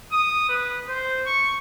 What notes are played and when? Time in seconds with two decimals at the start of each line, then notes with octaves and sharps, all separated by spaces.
0.12 D#6
0.49 B4
0.89 C5
1.26 C#6